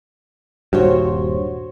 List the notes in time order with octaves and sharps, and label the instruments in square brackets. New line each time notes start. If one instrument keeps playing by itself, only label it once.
[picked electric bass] D#1 G#1 G2 [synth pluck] F#4 C5 C#5